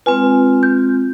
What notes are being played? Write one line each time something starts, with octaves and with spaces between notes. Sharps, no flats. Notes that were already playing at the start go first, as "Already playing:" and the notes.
G#3 C4 F4 B4 G#5
G6